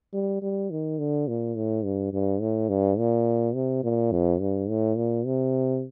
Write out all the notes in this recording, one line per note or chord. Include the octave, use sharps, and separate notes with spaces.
G3
G3
D#3
D3
A#2
A2
G2
G2
A2
G2
A#2
C3
A#2
F2
G2
A2
A#2
C3